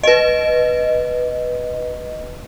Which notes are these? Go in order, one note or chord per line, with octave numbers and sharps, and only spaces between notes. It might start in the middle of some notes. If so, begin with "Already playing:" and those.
B4 D#5